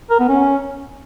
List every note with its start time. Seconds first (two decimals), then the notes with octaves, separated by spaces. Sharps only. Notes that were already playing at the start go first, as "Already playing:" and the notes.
0.10 A#4
0.20 B3
0.29 C#4